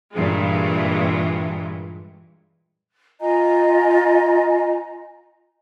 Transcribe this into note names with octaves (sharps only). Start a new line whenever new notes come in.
G2 A#2 E3 G#3
F4 D#5 G#5 A#5